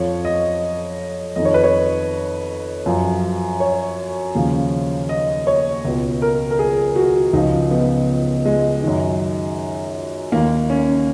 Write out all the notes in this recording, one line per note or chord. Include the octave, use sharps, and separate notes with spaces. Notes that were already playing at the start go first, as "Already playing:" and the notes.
Already playing: F2 F3 C#5
D#5
F2 D#3 D#5
C#5
B4
C#5
F#2 F3
C#5
D#2 C#3 F3
D#5
C#5
C#2 B2
A#4
A#4
G#4
F#4
C#2 C#3 F3 D#4
B3
G#3
F#2 D#3
D#2 D#3 A#3
C#4